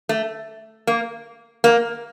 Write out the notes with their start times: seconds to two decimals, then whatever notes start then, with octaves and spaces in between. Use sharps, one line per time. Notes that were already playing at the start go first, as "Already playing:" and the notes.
0.09 A3
0.87 A#3
1.64 A#3